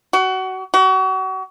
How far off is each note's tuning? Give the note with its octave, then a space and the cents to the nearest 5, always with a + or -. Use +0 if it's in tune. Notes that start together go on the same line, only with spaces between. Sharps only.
F#4 +25
F#4 +35